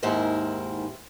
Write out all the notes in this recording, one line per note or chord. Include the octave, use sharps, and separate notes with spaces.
D#2 G#2 E4 A#4 C5